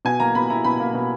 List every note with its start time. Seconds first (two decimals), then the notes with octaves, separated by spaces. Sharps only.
0.05 B2 G#5
0.20 A#3 A#5
0.35 B2 B5
0.50 E4 A#5
0.64 B2 B5
0.80 A#3
0.94 B2